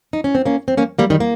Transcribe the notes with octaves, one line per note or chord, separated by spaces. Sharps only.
D#4
C#4
C4
A#3 C#4
C4
A#3 C#4
G3 A#3
D#3 G3
A#3